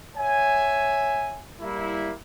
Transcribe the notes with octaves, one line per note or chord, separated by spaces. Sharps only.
C#5 E5 G#5
G3 A#3 E4